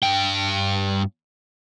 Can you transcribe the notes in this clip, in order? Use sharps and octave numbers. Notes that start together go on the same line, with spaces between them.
G2 G5